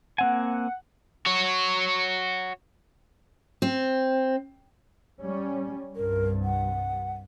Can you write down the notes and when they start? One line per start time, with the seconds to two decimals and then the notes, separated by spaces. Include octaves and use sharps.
0.18 A#3 C4 F#5 G#5
1.26 F#4 C#5
3.62 C4
5.22 G3 C#4
5.96 C2 G2 A#4
6.43 F#5